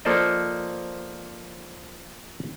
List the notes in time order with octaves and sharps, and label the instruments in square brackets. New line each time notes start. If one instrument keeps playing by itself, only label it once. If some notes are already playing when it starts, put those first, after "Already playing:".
[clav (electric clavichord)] F3 A#3 A4 C5 D5 D#5